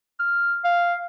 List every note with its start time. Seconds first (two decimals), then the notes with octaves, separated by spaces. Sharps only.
0.19 F6
0.64 F5